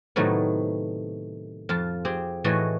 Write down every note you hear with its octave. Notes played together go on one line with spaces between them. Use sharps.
A2 C3 D#3 F#3 A3 B3
F2 F4 A5
C4 G4 G#4
A2 E3 A3 F#4 G#4 D#5